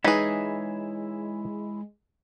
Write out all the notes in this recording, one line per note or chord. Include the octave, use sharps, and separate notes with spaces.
E3 G#3 D#4 E4 G#4 B4 C#5 E5